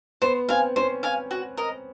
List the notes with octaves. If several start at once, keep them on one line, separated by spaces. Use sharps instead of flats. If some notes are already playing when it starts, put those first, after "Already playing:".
B3 C5
C4 F5 G#5
C#4 C5
F5 G#5
F#4
A#4 D#5